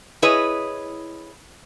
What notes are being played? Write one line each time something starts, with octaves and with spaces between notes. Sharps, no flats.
E4 G#4 B4 C#5 D#5